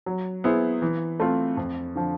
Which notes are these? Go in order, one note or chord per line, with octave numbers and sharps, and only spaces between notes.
F#3
B3 E4 G#4 C5
E3
A3 C4 F4
F2
D3 F3